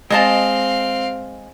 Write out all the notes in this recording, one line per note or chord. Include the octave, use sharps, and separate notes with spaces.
G#3 C4 D#5 F5 A5